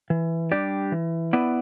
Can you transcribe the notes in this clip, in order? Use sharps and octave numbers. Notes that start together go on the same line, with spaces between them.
E3
G3 D4 G4 D5
E3
B3 E4 B4 D5